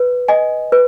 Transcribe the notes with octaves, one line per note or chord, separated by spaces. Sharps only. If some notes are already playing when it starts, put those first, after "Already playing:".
Already playing: B4
D#5 G#5
B4